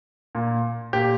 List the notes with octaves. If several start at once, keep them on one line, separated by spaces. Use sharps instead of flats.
A#2
A#2 G4